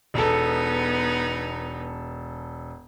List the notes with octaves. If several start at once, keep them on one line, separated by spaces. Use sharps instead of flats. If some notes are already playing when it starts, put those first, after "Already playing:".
E1 B3 D#4 A4